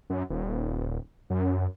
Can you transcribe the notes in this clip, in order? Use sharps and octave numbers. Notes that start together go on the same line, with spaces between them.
F#2
D#1
F#2